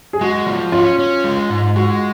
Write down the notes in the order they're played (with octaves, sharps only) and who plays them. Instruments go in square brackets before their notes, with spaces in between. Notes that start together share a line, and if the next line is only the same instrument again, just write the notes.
[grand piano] G#4
[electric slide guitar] G#3 [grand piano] F#4
[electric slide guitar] F3
[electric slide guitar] C#4 [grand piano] F4
[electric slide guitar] C#4
G#3
G#2
[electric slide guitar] G#3 [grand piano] F#4